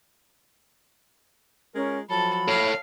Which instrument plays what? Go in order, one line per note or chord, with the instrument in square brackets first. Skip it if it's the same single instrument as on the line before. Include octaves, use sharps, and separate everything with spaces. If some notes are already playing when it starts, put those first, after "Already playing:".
[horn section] G#3 F4 A#4 [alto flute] C#4
[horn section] F3 F#3 [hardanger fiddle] A4 [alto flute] B5
[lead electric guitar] A4 C#5 [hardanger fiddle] F5